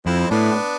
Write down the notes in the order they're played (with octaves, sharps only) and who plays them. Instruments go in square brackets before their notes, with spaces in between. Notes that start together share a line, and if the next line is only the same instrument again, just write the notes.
[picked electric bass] F2 [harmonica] C4 E4
[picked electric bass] A2 [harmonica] B3 D4